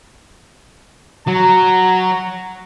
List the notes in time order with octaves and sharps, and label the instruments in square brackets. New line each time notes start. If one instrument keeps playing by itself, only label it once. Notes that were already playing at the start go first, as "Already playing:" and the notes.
[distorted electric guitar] F#3 [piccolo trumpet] A#5